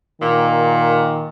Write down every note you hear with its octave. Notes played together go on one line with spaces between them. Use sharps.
A#2 D#3